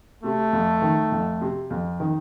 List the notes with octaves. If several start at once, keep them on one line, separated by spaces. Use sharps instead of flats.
C3 A3
F2
D#3
F2
C3
F2
D#3